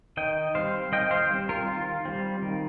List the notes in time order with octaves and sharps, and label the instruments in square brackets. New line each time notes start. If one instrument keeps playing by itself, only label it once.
[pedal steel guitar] D#3 D#5 G5
G3 C4 C5 F5
D#3 D#5 G5
C5 F5
G3 C4
F4 A#4
D#3 F4
G3 C4
D#3